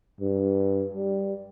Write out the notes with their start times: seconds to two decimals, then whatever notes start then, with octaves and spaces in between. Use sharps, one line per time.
0.20 G2
0.94 G3